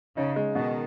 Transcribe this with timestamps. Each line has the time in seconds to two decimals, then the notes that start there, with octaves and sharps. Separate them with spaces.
0.17 C#3 D#4
0.36 G#3
0.55 B2 D#3